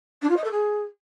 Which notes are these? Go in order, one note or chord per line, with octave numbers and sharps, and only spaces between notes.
D4
F4
D#5
A4
G#4